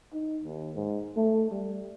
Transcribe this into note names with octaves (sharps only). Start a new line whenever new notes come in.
D#4
D#2
G#2
A3
G3